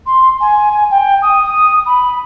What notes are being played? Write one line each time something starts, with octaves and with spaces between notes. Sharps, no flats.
C6
G#5
G#5
G5
D#6
D#6
B5